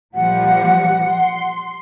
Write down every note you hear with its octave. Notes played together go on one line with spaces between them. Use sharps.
A#2 F3 G3 F#5
C6